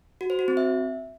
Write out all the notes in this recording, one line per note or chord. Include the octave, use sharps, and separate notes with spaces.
F#4
C5
F#4
C4
E5